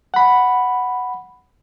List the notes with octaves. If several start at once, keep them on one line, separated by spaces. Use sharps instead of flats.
F#5 B5